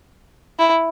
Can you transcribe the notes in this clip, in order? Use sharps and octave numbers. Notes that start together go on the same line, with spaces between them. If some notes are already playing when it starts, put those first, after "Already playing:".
E4